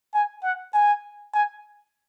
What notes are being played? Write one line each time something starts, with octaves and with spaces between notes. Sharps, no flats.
G#5
F#5
G#5
G#5